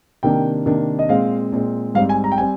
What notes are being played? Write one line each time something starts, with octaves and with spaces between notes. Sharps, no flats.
C3 D#3 A#3 D4 G5
C3 D#3 A#3 D4
D#5
A#2 G#3 C4 F5
A#2 G#3 C4
G#2 G3 C4 F5
G#5
A#5
G5
G3 C4 G#5